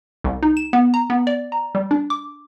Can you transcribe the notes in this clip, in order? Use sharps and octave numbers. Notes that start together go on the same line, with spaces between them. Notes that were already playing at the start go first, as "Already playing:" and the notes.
C2
D#4
E7
B3
A#5
B3
D5
A#5
G3
D4
D6